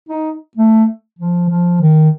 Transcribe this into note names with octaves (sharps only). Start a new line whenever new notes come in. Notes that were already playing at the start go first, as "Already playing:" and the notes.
D#4
A3
F3
F3
D#3